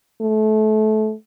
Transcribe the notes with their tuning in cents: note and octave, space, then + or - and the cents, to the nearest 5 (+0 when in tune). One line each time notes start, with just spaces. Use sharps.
A3 -25